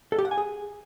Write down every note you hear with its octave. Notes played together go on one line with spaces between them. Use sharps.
A4
G4
F#5
G#5
G#4